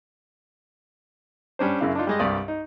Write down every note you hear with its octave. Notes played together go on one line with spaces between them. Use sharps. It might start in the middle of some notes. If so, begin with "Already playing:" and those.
G3 C#4 D4 C5
F#2 C#3 E4 F5
D4 D#4 F4
G3 G#3 D#5
C2 G2 G4 D5 F5 D#6
D#4